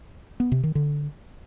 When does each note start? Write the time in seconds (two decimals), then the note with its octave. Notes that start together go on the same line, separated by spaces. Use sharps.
0.40 B3
0.52 C3
0.63 D#3
0.75 D3